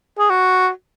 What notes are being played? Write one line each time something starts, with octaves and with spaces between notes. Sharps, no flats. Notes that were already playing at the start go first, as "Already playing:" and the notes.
G#4
F#4